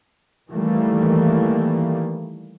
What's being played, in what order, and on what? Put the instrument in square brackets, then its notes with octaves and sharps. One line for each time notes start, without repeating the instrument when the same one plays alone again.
[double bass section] D#3 E3 G3 A3 A#3